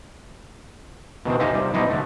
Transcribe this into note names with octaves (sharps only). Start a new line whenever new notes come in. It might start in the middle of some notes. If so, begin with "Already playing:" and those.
B2 D#3 E3 C4
C4 D#4 G4 E5 F5 G#5
C3 G3
B2 G3 C4 D#4 E4
D3 A3